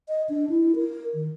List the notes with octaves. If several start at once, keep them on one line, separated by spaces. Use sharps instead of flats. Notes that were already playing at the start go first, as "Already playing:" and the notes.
D#5
D4
E4
A#4
D#3